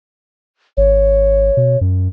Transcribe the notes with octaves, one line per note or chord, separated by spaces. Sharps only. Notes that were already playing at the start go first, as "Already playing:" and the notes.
G#1 C#5
B2
F#2